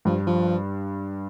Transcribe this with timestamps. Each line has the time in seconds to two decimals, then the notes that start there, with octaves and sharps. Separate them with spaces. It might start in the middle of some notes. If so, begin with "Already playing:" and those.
0.05 G2 F3
0.27 F3